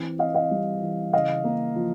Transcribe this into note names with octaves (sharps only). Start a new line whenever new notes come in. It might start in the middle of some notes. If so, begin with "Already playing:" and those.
Already playing: E3 C4
C4 D#5 F5
D#5 F5
G3
E3
C#3 D#5 F5
A#3
F3